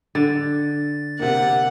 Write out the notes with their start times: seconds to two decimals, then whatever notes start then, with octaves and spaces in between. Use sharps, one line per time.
0.15 D3 A6
1.19 C3 A#3 F#5